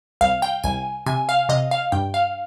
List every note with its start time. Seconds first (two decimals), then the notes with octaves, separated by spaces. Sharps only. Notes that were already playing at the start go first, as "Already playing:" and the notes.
0.21 C2 F5
0.42 G5
0.64 C2 G#5
1.06 C3 G#5
1.29 F5
1.49 C3 D#5
1.71 F5
1.92 G2 G5
2.14 F5